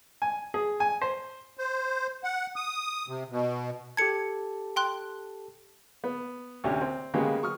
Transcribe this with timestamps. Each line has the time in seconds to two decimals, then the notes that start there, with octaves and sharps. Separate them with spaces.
0.22 G#5
0.54 G#4
0.80 G#5
1.02 C5
1.57 C5
2.24 F#5
2.56 D#6
3.08 C3
3.30 B2
3.97 G4 A4 A5 G#6 C#7
4.76 G5 C6 F#6
6.04 B3
6.64 D2 C3 C#4 G4
6.81 C4
7.14 C#3 G#3 A#3 B3 F#4 G4
7.42 F#3 C#6 D#6 F6